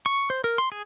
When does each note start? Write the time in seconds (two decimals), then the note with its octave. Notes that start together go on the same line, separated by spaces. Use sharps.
0.06 C#6
0.30 C5
0.44 A#4
0.58 C6
0.72 G#4